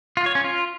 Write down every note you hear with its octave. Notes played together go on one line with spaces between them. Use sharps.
F4
C#5
C#4
F4